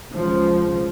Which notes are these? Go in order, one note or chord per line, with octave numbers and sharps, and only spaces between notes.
C#2 C#3 F3